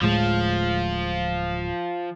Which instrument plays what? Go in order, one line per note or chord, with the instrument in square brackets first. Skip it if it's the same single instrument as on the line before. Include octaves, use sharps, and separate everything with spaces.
[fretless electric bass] D1 A2 G#3 [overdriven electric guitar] F3